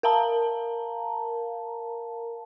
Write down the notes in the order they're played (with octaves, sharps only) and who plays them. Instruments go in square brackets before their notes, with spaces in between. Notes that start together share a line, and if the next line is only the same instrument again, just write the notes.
[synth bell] A#4 F5 A5 A#5